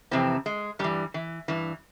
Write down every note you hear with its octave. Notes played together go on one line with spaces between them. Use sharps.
F2 C3 E3 C4
G#3
G2 E3 G3
E3
G2 E3